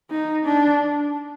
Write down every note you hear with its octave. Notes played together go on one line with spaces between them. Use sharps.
D#4
D4